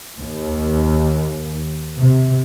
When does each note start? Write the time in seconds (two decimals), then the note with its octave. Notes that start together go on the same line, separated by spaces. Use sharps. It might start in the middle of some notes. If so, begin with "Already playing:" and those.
0.20 D#2
1.98 C3